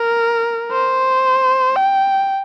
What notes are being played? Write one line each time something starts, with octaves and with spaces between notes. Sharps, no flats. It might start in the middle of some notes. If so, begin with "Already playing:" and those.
Already playing: A#4
C5
G5